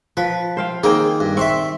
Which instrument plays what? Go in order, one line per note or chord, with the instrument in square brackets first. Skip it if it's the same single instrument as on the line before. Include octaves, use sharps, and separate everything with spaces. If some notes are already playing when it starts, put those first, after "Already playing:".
[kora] F3 [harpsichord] B4
[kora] C5 F5 G5
[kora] D#3 C4 G5 [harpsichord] A#3 G#4
[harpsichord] G2
[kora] C4 [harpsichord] E5 C6 C#6